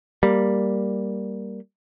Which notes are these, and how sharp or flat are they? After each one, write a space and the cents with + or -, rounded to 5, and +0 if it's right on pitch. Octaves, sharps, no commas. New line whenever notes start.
G3 +0 A#3 +0